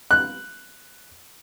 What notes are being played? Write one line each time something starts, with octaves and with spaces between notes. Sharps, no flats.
F#6